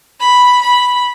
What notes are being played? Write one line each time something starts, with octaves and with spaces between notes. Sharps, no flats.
B5
B5